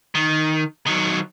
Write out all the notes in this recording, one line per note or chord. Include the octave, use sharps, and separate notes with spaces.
D#3
D#3 F#3